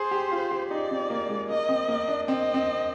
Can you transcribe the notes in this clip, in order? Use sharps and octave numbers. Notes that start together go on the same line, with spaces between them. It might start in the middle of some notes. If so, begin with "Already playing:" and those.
Already playing: G#4 C5
G4
F4
G4
D#4 D5
C4
A#3
G#3
A#3 D#5
C4
A#3
D4
C4 D#5
C4